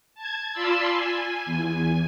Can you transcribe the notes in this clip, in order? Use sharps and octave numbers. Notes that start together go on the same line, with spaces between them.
A5 G#6
F4 D5 A5 B5 C6 E6
G#5
E2 G#5